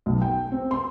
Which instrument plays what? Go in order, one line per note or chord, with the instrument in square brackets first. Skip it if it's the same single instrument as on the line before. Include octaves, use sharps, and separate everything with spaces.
[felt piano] B1
G5
C4
C6